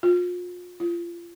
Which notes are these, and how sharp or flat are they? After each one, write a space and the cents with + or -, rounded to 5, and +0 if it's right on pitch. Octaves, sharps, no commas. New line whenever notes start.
F4 +35
F4 -30